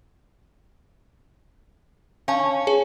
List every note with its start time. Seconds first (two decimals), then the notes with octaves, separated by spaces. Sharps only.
2.28 C#4 F5 A5
2.67 G#4 C#5